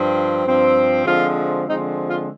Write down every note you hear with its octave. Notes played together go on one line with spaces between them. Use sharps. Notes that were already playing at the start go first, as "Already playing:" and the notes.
Already playing: G2 F3 C4
G2 F3 C4
D3 F3 G#3 C4 F4
D3 F3 G#3 C4 D#4
F4